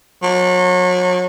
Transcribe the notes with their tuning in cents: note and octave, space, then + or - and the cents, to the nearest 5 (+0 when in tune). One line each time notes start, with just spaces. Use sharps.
F#3 -35